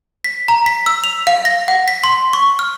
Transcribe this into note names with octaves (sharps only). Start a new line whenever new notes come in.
B6
A#5
B6
E6
F7
F5
A#6
F#5
B6
C6
C#6
F6